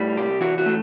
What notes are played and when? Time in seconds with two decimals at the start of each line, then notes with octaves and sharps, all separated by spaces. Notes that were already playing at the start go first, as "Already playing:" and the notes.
Already playing: A2 G3
0.17 C2 G4
0.41 E3 F#4
0.58 F#4
0.66 A3